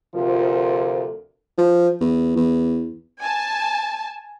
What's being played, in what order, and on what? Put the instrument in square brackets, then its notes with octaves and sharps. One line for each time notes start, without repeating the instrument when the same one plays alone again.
[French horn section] D2 C3 F3 F4 A4 A#4
[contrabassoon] F3
E2
E2
[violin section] G#5 A5